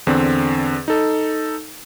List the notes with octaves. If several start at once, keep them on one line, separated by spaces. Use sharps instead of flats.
E2 D3 C4
D#4 A4